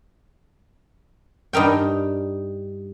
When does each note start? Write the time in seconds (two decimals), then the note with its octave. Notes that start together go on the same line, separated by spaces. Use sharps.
1.53 G2 D#4 A#4 G5